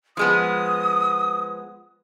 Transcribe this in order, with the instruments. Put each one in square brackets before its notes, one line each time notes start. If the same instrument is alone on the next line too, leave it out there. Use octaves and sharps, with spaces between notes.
[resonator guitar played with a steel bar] F3 G#3 B3 [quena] D#6